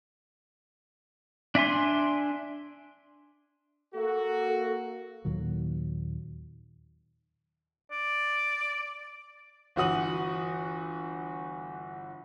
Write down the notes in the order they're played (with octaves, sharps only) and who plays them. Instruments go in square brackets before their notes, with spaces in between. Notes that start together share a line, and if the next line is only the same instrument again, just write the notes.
[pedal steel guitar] D4 E5 G#5 C6
[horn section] A#3 F#4 [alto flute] A4
[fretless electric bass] D#2 A#2 D#3 F#3
[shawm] D5
[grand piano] G1 E3 F#4 D#6 F#7